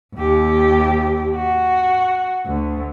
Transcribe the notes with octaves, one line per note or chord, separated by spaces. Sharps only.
D#2 G4
F#4
D2